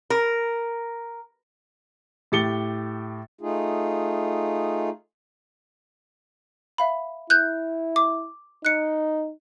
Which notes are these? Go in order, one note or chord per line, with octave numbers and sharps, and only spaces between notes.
A#4
A2 G4 A6 C#7 G7
A3 D#4 F4 G#4
E5 F5 B5
E4 F#6 G6
D6
D#4 F#6 C#7